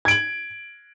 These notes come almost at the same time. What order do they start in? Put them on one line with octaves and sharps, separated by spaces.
G#6 D7 F#7